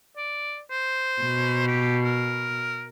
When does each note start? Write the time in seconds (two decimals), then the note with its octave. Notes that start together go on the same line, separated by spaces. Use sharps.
0.17 D5
0.71 C5
1.22 B2
1.67 G4
2.04 A#4